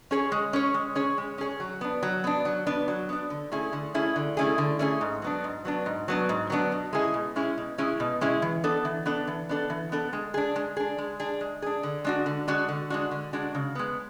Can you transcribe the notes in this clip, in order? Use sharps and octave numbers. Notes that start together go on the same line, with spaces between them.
C#4 G#4 C#5
G#3
C#4 G#4 C#5
G#3
C#4 G#4 C#5
G#3
C#4 G#4 C#5
F#3
B3 D4
F#3
B3 D4
F#3
B3 D4
F#3
B3 D4
D3
A3 C#4 E4 G#4
D3
A3 C#4 E4 G#4
D3
A3 C#4 E4 G#4
D3
A3 C#4 E4 G#4
G#2
F#3 B3 D4
G#2
F#3 B3 D4
G#2
F#3 B3 D4
G#2
F#3 B3 D4
B2
G#3 C#4 E4 G#4
B2
G#3 C#4 E4 G#4
B2
G#3 C#4 E4 G#4
B2
G#3 C#4 E4 G#4
E3
B3 D4 A4
E3
B3 D4 A4
E3
B3 D4 A4
E3
B3 D4 A4
G#3
D4 G#4
G#3
D4 G#4
G#3
D4 G#4
G#3
D4 G#4
D3
G#3 D4 F#4
D3
G#3 D4 F#4
D3
G#3 D4 F#4
D3
G#3 D4 F#4
C#3
G#3 B3